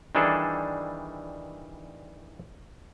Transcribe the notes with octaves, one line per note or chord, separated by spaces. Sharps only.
D#3 E3 G3 D4 G#4 A4